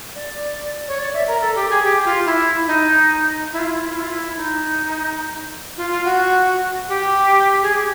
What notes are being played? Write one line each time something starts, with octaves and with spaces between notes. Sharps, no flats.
D5
C#5
D5
E5
A#4
A4
G4
G#4
G4
F4
E4
D#4
E4
F4
E4
F4
E4
F4
E4
F4
E4
D#4
F4
F4
F#4
G4
G#4
G4